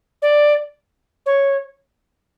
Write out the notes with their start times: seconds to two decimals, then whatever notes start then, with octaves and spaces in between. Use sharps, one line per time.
0.22 D5
1.26 C#5